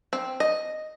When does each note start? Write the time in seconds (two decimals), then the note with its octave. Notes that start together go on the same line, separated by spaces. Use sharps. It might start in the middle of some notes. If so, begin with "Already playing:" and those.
0.13 C4
0.40 D#5